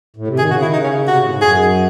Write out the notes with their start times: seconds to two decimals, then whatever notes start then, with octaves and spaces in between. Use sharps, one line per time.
0.16 A2
0.28 C3
0.38 D#3 G#4
0.50 C#3 F#4
0.61 D#3 E4
0.73 C#3 D#4
0.84 C#4
1.07 C3 F#4
1.14 G#2
1.18 A2
1.30 G#2
1.41 F#2 G#4